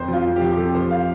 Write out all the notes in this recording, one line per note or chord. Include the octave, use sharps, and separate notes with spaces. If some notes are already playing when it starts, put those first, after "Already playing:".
Already playing: F2 C5
F3
F4
F2
G4
F3
G4
F2 A4
F3 C5
F5